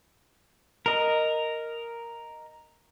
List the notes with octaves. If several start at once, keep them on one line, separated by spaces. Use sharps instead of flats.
A#4 D#5